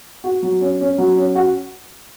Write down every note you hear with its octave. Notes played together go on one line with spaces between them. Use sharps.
F#4
F#3
C#4
C#4
F#3
C#4
F#4